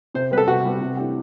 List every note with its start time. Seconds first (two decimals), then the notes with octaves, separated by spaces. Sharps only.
0.14 C3 C5
0.31 G3 B3 B4
0.37 A4
0.48 C3 F#4
0.65 G3 B3
0.81 C3
0.97 E3 A3 D4 G4